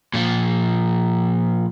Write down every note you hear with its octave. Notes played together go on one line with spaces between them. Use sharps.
A#2 F3